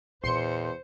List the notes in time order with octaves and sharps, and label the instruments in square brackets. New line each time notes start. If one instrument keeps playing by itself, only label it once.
[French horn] E2 [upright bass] A#2 C#4 [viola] C5 [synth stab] C6 C#7